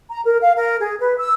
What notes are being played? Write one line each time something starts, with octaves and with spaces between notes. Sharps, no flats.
A#5
A#4
F5
A#4
G#4
B4
E6